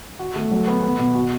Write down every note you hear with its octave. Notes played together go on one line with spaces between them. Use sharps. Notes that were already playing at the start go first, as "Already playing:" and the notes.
F#4
A3
F#3
B3
B3
B2
F#4